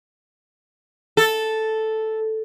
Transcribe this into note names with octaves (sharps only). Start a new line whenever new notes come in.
A4